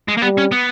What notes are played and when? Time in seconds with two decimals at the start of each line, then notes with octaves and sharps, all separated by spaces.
0.08 G#3
0.18 A#3
0.22 G3 B3
0.38 C#4
0.52 B3